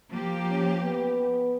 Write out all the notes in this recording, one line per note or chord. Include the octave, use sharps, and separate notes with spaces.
F3 A#3 G4
C#4
B3